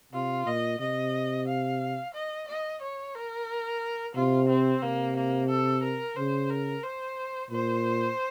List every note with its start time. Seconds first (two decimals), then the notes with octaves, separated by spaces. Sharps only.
0.13 C3 F4
0.46 A#2 D#5
0.80 C3 D#5
1.47 F5
2.14 D#5
2.48 D#5
2.81 C#5
3.15 A#4
4.15 C3 F4
4.49 C4
4.82 C3 A#3
5.16 A#3
5.49 A4
5.83 A#4
6.16 C#3 C5
6.50 A#4
6.83 C5
7.50 A#2 C5